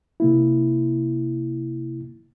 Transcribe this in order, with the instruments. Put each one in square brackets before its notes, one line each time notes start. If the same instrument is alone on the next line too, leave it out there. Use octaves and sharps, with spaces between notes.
[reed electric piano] C3 A#3 E4